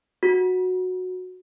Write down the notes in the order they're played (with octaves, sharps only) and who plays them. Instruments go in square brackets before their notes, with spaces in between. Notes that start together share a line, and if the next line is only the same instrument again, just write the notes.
[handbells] F#4